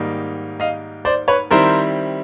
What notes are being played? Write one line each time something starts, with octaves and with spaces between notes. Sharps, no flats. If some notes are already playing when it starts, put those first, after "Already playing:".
Already playing: G#2 D#3 G3 A#3 D#4
D#5 F5
C5 D5
B4 C#5
D#3 G3 C4 E4 A#4 C5